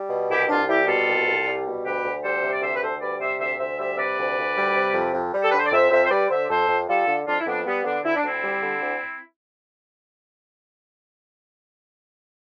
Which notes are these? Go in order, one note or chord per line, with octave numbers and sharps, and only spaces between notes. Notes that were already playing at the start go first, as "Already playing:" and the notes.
Already playing: G3
B2
C2 E4 G4
C2 D4 F4
G3 E4 G4
B2 F4 A4
C2
C2
G3
B2
D2 G4 B4
D2
G3 A4 C5
C3
D5
D2 C5 E5
B4
D2 A4 C5
G3 B4 D5
C3 C5 E5
D2 C5 E5
D2 C5 E5
G3 C5 E5
C3 B4 D5
D2
D2
G3
C3
F2
F2
G3
A4
B4
D3
C5
D5
F2 C5 E5
F2 C5 E5
C5
G3 B4 D5
D3 C5 E5
D5
F2 A4 C5
F2
G3 F4 A4
D3
F2 D4 F4
E4
F2 B3 D4
G3 B3
D3 B3 D4
D2 E4
D4
D2 C4 E4
G3
D3
D2